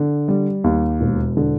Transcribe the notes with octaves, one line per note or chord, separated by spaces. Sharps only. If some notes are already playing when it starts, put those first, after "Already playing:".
Already playing: D3
G3
D#2
E1
D3